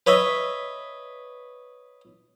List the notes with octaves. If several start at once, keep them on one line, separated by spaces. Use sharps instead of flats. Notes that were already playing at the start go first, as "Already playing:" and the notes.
B4 C#5 D#5 E5